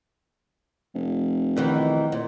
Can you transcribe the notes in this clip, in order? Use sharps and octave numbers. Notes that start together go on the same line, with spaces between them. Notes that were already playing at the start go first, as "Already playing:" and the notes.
F1
E2 D#3 E3
A#2